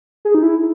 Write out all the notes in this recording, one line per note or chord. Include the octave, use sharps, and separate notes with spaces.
G#4
D#4
E4